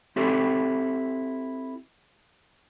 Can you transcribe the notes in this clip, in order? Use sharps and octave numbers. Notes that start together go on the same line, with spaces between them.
C4 E4 G4 A4